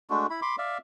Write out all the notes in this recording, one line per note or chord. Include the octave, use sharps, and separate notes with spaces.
G#3 A3 D4 F#4
E4 B5
B5 C6 D6
D5 E5 F5